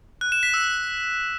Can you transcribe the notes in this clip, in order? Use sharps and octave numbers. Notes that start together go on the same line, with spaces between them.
F#6
E7
B6
E6